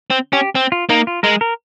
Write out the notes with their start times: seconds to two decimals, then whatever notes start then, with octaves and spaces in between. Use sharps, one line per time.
0.10 C4
0.33 C#4 G4
0.55 C4
0.72 F4
0.89 A#3 D#4
1.07 F4
1.23 G#3 A#4
1.41 A#4